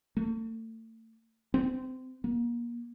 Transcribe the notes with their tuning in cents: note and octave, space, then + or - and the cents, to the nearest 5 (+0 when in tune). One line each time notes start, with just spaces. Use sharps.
A3 +35
C4 -25
A#3 +30